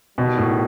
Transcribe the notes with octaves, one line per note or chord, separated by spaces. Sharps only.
E2 B2 D#3 G3
A2